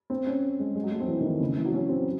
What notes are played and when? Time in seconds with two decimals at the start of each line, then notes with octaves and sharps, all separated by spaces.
0.10 C4
0.27 C#4
0.60 G#3
0.75 G#3
0.83 F#3
0.92 A3
1.00 C4
1.07 E3
1.21 D#3
1.25 E3
1.40 C#3
1.57 E3
1.65 F#3
1.74 C#4
1.89 C4
2.02 F#3